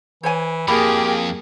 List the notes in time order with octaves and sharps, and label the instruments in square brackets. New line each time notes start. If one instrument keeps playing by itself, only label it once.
[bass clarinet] E3 [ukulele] C5 C#5 G#5
[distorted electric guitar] F2 [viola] A#3 G#4 [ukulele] E4 B5 [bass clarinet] G4